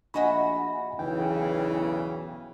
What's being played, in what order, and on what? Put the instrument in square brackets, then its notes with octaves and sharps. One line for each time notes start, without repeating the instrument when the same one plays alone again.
[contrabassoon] A#1 [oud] F#4 D#5 E5 [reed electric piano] F#5 G#5 B5
[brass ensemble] B1 E2 C#3 [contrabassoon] E3 [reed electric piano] G5